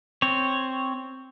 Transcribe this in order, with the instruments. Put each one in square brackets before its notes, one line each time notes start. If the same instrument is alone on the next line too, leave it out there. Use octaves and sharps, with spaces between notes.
[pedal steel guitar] C4 C#5